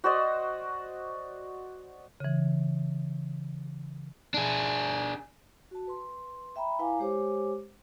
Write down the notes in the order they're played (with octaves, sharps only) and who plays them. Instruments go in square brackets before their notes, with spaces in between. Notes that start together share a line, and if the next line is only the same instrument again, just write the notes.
[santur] F#4 C5 D5 D#5
[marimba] C#3 E3
[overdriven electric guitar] D4 G#4
[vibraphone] F#4 A5
B4 C6
E5 G5 A#5 B5
E4 B4 F5 G#5 A#5 D6
G#3 G4 C5 C#5 D6